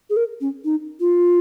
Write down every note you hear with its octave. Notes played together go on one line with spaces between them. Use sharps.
G#4
A#4
C#4
D#4
F4